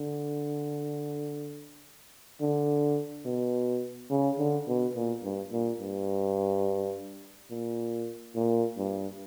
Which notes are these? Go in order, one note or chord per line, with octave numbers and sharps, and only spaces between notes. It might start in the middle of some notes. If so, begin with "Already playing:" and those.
Already playing: D3
D3
B2
C#3
D3
B2
A#2
G2
A#2
G2
A#2
A#2
G2